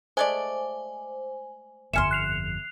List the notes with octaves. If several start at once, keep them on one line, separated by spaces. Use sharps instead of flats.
G#3 A3 C5 D5 G#5
G1 F2 E5 G#5 C6 F6 C#7 E7
F#6 C7 F7